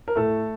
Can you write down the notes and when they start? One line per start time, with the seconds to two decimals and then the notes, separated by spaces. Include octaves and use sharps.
0.08 A#4
0.16 A2 A3 A4